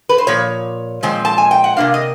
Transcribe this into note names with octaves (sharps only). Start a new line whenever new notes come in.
B4
C5
A#2 F3 C#5
A#2 F3 G#3 C4
A5
G#5
G5
F#5
C3 F3 A#3 D4 F5
D#5